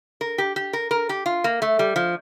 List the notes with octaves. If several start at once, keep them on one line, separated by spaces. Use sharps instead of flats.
A#4
G4
G4
A#4
A#4
G4
F4
A#3
A3
G3
F3